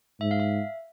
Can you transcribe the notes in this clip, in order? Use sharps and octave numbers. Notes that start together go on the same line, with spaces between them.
G#2 E5
F5
E5